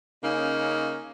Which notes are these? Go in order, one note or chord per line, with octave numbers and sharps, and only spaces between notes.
C#3 A#3 C#4 D#4